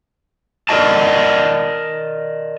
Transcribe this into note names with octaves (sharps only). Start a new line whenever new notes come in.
A#4 B4 D5 D#5 A5